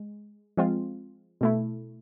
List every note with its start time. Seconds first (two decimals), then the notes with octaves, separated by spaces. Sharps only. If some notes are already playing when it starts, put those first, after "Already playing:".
Already playing: G#3
0.57 F3 G#3 C4 F4
1.41 B2 A3 E4